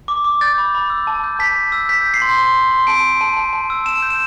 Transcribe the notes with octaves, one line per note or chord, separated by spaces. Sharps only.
D6
D6
G6 A6
B5
B5
E6
A5
G6
A5 B6
A5
E6
G6 B6
G6
C7
C6
C6
C6
C6
A5 D7
A5
A5
A5
A5
E6
A5 E7
G6
E7